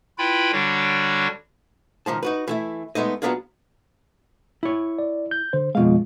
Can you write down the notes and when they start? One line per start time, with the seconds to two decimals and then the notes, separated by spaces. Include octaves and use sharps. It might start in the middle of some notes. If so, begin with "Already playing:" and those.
0.18 E4 F4 B4 G5 B5
0.52 D3 G3 D4 F#4 C#5
2.06 C#2 D#3 F3 A5
2.23 D#4 F#4 B4
2.48 E3 A3 E4
2.95 G#3 A3 B3 D#4 D#5
3.22 F#3 A3 B3 D4 F4 G#4
4.63 E4 C#5
4.99 D5
5.31 G6
5.53 D3 C5
5.75 F2 B2 G#3 F4 F5